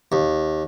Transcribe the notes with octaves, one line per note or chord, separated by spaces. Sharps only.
D#2